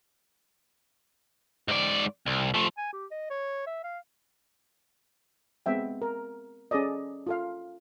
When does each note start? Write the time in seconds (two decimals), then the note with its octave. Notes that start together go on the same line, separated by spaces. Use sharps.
1.68 G#2 D5
2.26 C2
2.54 F3 A3
2.77 G#5
2.93 G4
3.11 D#5
3.30 C#5
3.67 E5
3.83 F5
5.66 G#3 B3 C4 E5 G5
6.02 A#4
6.71 C#4 G#4 A4 D5 D#5
7.27 F4 A4 F5